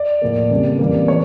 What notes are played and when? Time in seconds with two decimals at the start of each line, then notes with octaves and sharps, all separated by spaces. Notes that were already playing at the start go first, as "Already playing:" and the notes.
Already playing: D5
0.22 A2 F3 A#3
0.50 F2 C#3 G3 A#3
0.79 F2 E3 G3 A#3
1.08 E3 A3 C#5